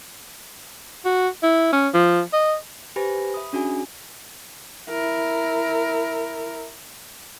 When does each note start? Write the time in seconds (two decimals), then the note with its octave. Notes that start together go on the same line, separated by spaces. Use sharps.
1.05 F#4
1.43 E4
1.73 C#4
1.94 F3
2.33 D#5
2.96 G4 B4 C5 G#5 B5 A#6
3.34 E5 B5 D#6
3.53 C#4 D4 F#4 G#4 G#5
4.89 E4 A#4